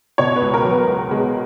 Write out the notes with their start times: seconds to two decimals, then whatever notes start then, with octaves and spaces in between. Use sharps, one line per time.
0.18 B2 C#5
0.36 B4
0.41 C#2
0.54 A#4
0.64 F#3
0.71 B3
0.87 C#2
1.10 B2 G#3